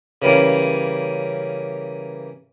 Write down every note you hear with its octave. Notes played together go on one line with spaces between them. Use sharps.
C#3 E3 G3 A#3 C#4